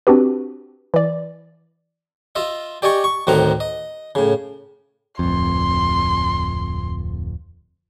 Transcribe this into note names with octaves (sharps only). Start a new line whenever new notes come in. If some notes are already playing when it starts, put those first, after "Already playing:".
C4 D4 F#4 G4 B4
E3 D5
F4 D#5 E5
G4 D5 D#5 G#5 C#6
C#6
D2 A2 D#3 C4 F#5 A#5
D#5
A2 C#3
D1 F2 C6